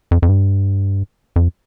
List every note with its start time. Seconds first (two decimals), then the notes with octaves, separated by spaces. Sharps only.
0.11 F2
0.22 F2
0.29 G2
1.36 F2